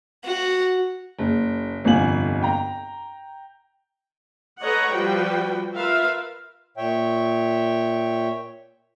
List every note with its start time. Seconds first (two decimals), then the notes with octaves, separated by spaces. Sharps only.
0.25 F#4
1.18 F#1
1.84 G1 C2 F2 F4 G#5 F#7
2.42 G5 A#5
4.61 A4 B4 C#5 D#5 F#5 A#5
4.91 F3 G3 F#4 B4 G5
5.74 F4 A#4 B4 E5 F5
6.77 A#2 C#5 E5 G5